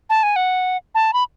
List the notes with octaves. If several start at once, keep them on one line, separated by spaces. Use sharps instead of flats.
A5
G#5
F#5
A5
B5